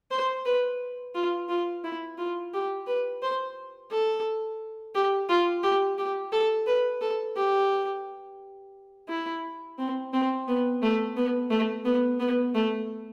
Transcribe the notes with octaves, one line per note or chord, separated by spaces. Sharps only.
C5
B4
F4
F4
E4
F4
G4
B4
C5
A4
G4
F4
G4
G4
A4
B4
A4
G4
E4
C4
C4
B3
A3
B3
A3
B3
B3
A3